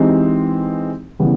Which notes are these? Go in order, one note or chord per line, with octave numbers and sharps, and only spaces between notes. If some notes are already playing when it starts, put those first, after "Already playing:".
Already playing: E3 G#3 C4 D#4 G4
C#3 E3 G3 B3